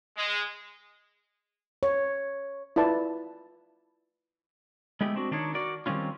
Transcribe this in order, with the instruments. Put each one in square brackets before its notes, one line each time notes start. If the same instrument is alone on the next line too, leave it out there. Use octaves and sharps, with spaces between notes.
[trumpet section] G#3
[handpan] C#5
[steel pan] E4 F4 B4 D5 A5
[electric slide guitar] G#3 A3 B3 E4 G4 G#4
C4 D4 F#4
D#3 D4 D#4 C#5
F#4 A#4 D5
D#3 G3 C4 C#4 F4